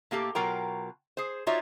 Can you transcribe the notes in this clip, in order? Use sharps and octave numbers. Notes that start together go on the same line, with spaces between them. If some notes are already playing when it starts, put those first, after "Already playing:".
A2 A#3 G4 A4
B2 F#3 F4 A#4 G5 A#5
G#4 C5
D#4 F4 F#4 C#5 D5 E5